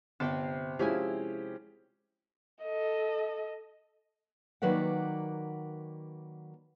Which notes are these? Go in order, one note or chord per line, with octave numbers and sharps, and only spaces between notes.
G1 C3 G5 A5
F3 G#3 C#4 E4 G4 G#5
A4 D#5
D#3 F#3 A#3 B4 D5 F#5